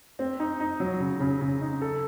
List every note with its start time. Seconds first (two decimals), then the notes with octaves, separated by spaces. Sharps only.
0.19 C4
0.40 D#4
0.60 D#4
0.80 F#3
1.00 C#3
1.20 C#3
1.41 C#3
1.61 D#4
1.82 A4